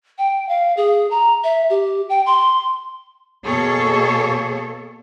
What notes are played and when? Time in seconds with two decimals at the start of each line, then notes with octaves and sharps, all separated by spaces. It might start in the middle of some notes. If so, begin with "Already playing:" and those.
0.18 G5
0.49 F5
0.77 G#4
1.11 A#5
1.44 E5
1.70 G4
2.09 G5
2.26 C6
3.44 B2 A#3 G#4 A4 C#5